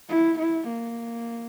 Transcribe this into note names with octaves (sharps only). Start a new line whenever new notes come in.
E4
E4
A#3